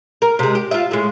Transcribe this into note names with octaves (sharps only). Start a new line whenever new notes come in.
A#4
C3 G#3
G4
F4 E5
A2 G#3